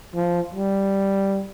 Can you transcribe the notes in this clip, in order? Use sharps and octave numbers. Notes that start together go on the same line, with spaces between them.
F3
G3